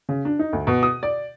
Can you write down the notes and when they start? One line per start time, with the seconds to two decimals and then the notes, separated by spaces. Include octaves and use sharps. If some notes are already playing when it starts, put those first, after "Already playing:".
0.09 C#3
0.25 D4
0.39 D#4
0.53 D2
0.67 B2
0.83 D#6
1.03 D5